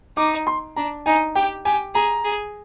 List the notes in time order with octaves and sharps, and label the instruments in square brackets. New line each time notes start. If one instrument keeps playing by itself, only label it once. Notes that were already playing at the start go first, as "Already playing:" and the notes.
[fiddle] D#4 [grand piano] D6
[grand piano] C6
[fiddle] D4 [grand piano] A#5
[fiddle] D#4 [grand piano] G#5
[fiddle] G4 [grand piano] G5
[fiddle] G4 [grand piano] G#5
[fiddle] G#4 [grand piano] A#5
[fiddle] G#4